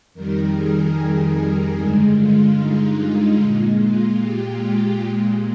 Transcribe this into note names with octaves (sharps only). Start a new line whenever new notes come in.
F2 D#3 G3 A#4
G#4
G2 D3 G#3
F4
D#4
A#2 G#3
F4
G4
A#2 G#3